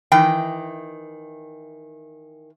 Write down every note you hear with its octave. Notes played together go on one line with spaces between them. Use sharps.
D#3 E3 G5